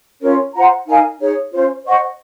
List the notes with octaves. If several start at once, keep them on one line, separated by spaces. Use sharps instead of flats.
C#4 F4 A#4 C#5
F4 C5 F#5 A#5
D#4 A#4 F5 G#5
D#4 G#4 C#5
C#4 F4 C5
C5 D#5 F#5 C#6